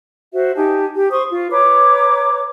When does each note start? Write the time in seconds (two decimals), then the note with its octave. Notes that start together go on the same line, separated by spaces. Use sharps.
0.33 F#4 C5 E5
0.56 D#4 G4 G#5 A5
0.95 G4
1.10 C5 C6 C#6 D#6
1.30 F4
1.52 B4 C#5 A#5 D6